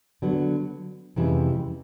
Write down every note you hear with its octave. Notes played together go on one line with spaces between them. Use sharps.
D3 F#3 B3
F2 C3 E3 G#3 C#4